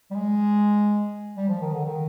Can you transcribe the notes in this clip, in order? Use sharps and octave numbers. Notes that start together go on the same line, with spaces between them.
G3
G#3
G3
F3
D#3
D3
D#3